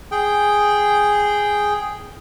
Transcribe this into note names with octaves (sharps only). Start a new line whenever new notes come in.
G#4 G5